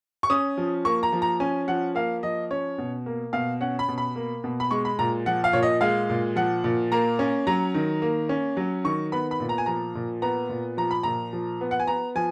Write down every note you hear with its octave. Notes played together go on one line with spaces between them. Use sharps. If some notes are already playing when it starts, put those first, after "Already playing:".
C#6
C#4 D#6
F3
A#3 C#6
A#5
F3
A#5
C#4 G#5
F3 F#5
A#3 F5
F3 D#5
C#4 C#5
B2
A#3
B2 F5
C#4 F#5
B5
B2
B5
A#3
B2
B5
G#3 C#6
B5
A#2 A#5
F3 F#5
F5
A#2 C#5
D#5
G#3 F5
A#2
F3 F#5
A#2
A#3 A#5
C#4
F#3 A#5
D#3
A#3
C#4
F#3
D#3 C#6
B3 B5
B5
A#2
A#5
G#5
F3 A#5
A#2
B3 A#5
A#2
F3 A#5
B5
A#2 A#5
F3
B3
F#5
G#5
B3 A#5
F3 G#5